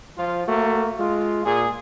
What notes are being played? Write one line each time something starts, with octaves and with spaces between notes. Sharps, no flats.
F3 F4
A3 A#3 F#4
G#3 F4
A#2 G#4